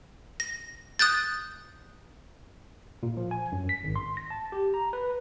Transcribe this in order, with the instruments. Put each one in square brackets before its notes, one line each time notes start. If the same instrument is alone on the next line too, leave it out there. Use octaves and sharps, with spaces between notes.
[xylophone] A#6
D#6 F#6 G6 A6
[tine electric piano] A#2
F3
G#5
F#2
B6
G#1
C6
A#6
A5
G4
A#5
B4